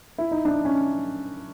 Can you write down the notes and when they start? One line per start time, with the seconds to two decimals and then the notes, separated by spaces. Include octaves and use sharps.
0.18 E4
0.31 D#4
0.45 D4
0.65 C#4